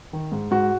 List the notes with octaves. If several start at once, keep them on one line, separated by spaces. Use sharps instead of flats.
D#3
G#2
G#2 F#4